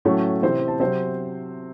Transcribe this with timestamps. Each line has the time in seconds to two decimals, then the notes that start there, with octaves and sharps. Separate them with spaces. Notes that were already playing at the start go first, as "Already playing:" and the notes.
0.05 A2 F#3 A3 C#4 C#5
0.43 C3 E3 C4 C5
0.68 A5
0.80 C3 F#3 C4 C5